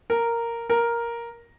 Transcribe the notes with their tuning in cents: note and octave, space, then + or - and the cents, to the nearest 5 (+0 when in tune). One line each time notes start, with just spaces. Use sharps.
A#4 -5
A#4 +5